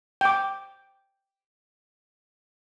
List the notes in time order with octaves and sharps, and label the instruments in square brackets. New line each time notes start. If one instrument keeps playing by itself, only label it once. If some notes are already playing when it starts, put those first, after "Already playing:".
[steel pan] G5 D6